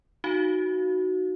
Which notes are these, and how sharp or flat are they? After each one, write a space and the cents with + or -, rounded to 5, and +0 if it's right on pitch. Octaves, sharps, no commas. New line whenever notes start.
D#4 +0 F#4 +0 F5 +0